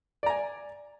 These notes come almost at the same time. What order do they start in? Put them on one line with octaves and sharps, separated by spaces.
D5 A#5 G#5